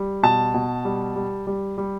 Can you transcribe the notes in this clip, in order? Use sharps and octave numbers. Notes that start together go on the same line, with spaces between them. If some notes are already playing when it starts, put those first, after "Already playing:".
Already playing: G3
B2 A5
B2
G3
G3
G3
G3